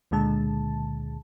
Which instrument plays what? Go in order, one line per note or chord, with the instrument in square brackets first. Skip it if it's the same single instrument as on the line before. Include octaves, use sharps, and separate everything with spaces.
[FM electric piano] C#2 A#2 D3 G#3 A5